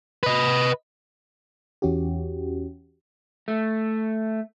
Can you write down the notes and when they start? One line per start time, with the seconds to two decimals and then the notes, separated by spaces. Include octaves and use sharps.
0.23 B4 D#5
1.82 E2 E3 C#4 F#4 G4
3.48 A3